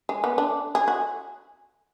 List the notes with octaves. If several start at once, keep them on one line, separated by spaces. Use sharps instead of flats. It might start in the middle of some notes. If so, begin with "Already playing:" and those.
G#3
B3
D4
G#4
F#4